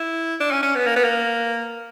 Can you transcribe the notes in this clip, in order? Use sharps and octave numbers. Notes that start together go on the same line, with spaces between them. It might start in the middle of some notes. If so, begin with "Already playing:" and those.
Already playing: E4
D4
C#4
C#4
B3
A#3
B3
A#3